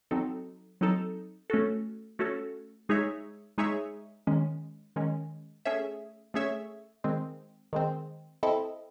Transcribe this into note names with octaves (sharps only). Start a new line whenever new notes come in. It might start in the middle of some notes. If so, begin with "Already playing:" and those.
F#3 C4 D#4 A4
F#3 C4 D#4 A4
A3 C#4 F#4 A4
A3 C#4 F#4 A4
G#3 D#4 G#4 C#5 E5
G#3 D#4 G#4 C#5 E5
D#3 G#3 C#4
D#3 G#3 C#4
A3 C#4 G#4 C#5 E5
A3 C#4 G#4 C#5 E5
D#3 G#3 C4
D#3 G#3 C4
C4 E4 A4 D#5